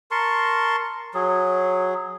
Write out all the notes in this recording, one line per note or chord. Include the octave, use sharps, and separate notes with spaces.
A#4 A5 C6 C#6
F#3 G#4